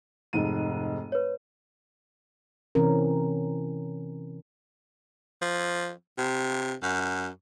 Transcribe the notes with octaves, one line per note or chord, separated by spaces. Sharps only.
F1 G#2 D#7
B4 C#5
C3 E3 C4 C#4 A#4
F3
C3
F#2